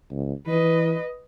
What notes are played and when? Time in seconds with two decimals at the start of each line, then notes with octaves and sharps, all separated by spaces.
0.11 C#2
0.47 E3 B4 D#5